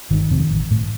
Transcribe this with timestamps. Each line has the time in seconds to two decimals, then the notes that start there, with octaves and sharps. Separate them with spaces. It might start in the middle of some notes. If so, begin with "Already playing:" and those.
0.10 G1 D#3
0.31 F2 C3
0.51 A1
0.71 A2